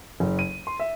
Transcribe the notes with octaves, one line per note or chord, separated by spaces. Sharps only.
F#1
D#7
C6
E5